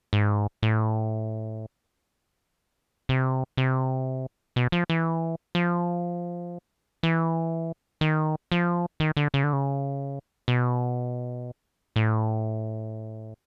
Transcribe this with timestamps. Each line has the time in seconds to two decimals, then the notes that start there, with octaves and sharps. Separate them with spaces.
0.13 G#2
0.63 A2
3.09 C3
3.57 C3
4.56 B2
4.72 F3
4.90 E3
5.55 F3
7.03 E3
8.01 D#3
8.52 F3
9.00 D#3
9.17 D3
9.34 C#3
9.44 D3
9.53 C#3
10.48 B2
11.96 A2